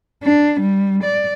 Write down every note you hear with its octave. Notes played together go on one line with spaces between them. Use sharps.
D4
G3
D5